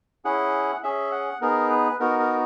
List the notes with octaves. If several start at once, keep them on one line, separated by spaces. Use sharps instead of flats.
C#4 E4 G#4 F#5
C#4 G#4 E5
F#5
B3 D#4 G#4 A#4
B4
B3 D#4 F#4 A#4
A#4